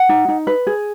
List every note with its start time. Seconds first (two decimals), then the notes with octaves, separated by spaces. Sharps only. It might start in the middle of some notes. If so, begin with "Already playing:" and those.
Already playing: F#5
0.09 D#4
0.28 D#4
0.47 B4
0.67 G#4